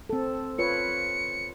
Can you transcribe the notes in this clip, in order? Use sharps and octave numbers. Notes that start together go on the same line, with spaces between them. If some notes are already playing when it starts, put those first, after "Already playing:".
C4 A4
F4 B4 C#5 C#7